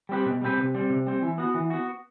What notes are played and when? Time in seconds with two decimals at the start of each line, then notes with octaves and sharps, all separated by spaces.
0.09 G3 C4 G4 B4
0.26 B2
0.41 G3 C4 G4 B4
0.57 C3
0.75 G3 C4
0.90 C3
1.07 G3 C4
1.22 E3
1.38 B3 F#4
1.54 E3
1.70 B3 F#4